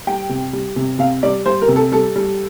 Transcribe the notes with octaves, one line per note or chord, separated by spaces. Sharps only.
G3 G5
C3
G3
C3
C3 F5
G3 D5
G3 C5
A#4
C3
A4
G3 A4
G3